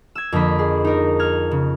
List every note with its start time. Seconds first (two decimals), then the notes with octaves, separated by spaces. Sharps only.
0.15 E6 G#6
0.32 F2 D3 A#3 D#5 B5 B6
0.59 G#4
0.85 D#4 A#4
1.19 F6 G#6
1.51 C#3